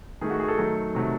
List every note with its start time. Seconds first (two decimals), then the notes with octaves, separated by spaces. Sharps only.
0.21 D#3 A3 G#4
0.30 F#4
0.39 G#4
0.48 A4
0.58 D#3 F#3 A3
0.95 C3 D#3 F#3 A3